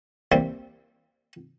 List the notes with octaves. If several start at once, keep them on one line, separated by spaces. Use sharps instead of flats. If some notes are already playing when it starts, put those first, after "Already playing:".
E3 G3 A#3 C4